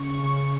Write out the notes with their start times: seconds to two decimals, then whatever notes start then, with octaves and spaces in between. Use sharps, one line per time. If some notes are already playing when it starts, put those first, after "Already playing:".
Already playing: C#3 C#6
0.23 C#3